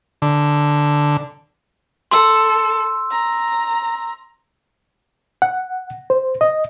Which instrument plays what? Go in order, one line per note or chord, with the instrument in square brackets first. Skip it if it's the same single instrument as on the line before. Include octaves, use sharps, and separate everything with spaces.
[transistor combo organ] D3
[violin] A4 [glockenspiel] C6 E6
[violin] A#5
[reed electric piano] F#5
C5
D#5